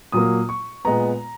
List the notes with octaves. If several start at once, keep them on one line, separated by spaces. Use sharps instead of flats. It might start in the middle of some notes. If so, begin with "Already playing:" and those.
A#2 F#3 A#3 D#6
C#6
A#2 G#3 B3 A#5